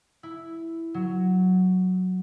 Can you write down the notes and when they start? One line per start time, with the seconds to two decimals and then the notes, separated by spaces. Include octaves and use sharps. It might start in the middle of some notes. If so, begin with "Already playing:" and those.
0.23 E4
0.94 F#3